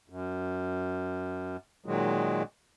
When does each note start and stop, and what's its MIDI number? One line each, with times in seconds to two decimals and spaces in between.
0.10 1.57 42
1.86 2.43 46
1.86 2.43 51
1.86 2.43 54
1.86 2.43 56